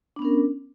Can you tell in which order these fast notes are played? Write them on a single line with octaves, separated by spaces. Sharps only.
D4 B3 C#4 A#4